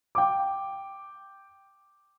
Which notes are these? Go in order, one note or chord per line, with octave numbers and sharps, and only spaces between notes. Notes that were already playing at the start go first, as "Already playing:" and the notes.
G5 D6